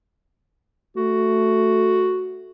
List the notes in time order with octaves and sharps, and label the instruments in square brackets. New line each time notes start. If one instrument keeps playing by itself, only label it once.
[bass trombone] A3 [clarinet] F#4